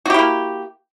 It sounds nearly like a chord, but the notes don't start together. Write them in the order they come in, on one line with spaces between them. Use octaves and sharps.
F#4 G4 E4 A#3